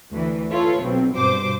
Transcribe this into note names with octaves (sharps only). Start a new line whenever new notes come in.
D2 E3
F4 A4 B4 C#5
B1 C4
G2 B2 C5 D6